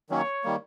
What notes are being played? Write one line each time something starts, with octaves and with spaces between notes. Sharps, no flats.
D#3 F#3 A#3 C#4 C#5
D#3 G3 A#3